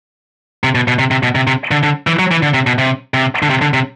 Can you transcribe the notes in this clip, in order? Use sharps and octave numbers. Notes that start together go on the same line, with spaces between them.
C3
B2
B2
C3
C3
B2
C3
C3
D3
D3
E3
F#3
E3
D3
C3
B2
C3
C3
D3
C3
D3
C3